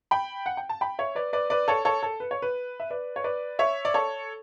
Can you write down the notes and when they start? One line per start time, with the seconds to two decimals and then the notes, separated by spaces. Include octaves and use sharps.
0.11 G5 B5
0.46 F#5
0.57 G5
0.69 A5
0.81 G5 B5
0.99 C#5 E5
1.15 B4 D5
1.33 B4 D5
1.50 B4 D5
1.68 A4 C#5
1.85 A4 C#5
2.03 A4
2.20 B4
2.31 C#5
2.42 B4
2.80 E5
2.90 B4 D5
3.16 C#5
3.24 B4 D5
3.59 C#5 E5
3.85 D5
3.94 A4 C#5